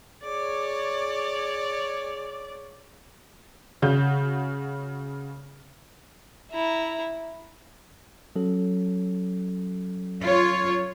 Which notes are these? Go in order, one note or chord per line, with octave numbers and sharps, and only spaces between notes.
G#4 C#5 D5
C#3 F#4 G6
E4 A#5
F#3 C#4 A4
F4 C#5